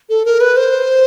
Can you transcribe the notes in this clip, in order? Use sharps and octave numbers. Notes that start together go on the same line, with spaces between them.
A4
A#4
B4
C5